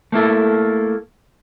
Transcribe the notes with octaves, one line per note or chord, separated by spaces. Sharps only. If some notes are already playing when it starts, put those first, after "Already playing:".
A3 A#3 E4 A4